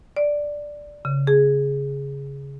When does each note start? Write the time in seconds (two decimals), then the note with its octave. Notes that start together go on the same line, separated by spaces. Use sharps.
0.17 D5
1.05 C#3
1.27 G#4